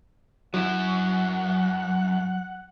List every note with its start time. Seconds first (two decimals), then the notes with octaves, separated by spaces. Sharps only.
0.54 F#2 F#3 E4 F#5